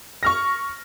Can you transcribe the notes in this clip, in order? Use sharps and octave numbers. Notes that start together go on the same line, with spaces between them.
C#6 F6 A#6